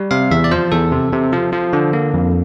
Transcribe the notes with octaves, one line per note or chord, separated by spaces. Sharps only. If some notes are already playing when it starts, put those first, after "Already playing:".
Already playing: G3
C3 F5
E2 E5
D5
F3 C5
E2 A4
C3
C3
F3
F3
D3
A#3
F2